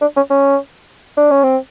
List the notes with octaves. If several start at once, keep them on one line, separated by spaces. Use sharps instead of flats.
D4
C#4
C#4
D4
C#4
C4